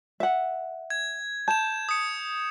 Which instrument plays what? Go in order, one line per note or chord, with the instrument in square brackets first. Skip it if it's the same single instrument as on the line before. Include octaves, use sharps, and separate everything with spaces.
[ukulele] E5 F#5
[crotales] G#6
[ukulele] A5 [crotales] G6 E7
[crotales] D#6 C#7